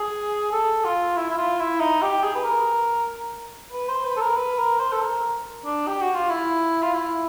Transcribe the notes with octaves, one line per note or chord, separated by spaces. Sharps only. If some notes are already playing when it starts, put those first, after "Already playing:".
Already playing: G#4
A4
F4
E4
E4
F4
E4
D#4
G4
G#4
B4
A#4
B4
C5
B4
A4
A#4
B4
A#4
C5
A4
A#4
D4
G4
F#4
F4
E4
F4
E4